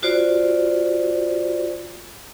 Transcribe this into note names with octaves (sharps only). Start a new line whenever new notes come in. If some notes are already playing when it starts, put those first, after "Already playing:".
F4 F#4 C5 D5